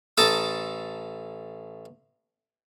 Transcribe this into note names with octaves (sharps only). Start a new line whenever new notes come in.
A1 A4 A5 A#5 D#6